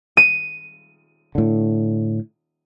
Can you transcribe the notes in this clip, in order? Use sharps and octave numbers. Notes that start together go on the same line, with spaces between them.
D#7
A2 D3